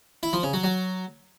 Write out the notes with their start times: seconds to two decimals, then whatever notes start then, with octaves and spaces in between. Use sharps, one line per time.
0.23 E4
0.33 F3
0.43 C#3
0.53 F#3
0.64 F#3